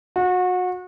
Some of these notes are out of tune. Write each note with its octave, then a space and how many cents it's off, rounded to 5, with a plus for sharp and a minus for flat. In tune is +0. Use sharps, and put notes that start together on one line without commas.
F#4 -30